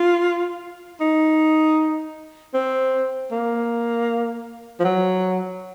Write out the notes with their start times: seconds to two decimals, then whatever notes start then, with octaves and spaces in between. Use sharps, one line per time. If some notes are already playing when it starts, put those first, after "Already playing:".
Already playing: F4
1.01 D#4
2.54 C4
3.31 A#3
4.80 F3
4.85 F#3